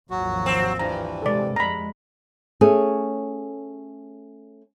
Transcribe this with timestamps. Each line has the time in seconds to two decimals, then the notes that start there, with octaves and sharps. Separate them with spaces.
0.11 G#1 D#2 F3 F#3 F#4
0.46 C4
0.79 G2 E3 A#5
1.22 C3 G#3 A4 D5
1.56 F2 G#3 A#5 B5
2.61 A3 C#4 G#4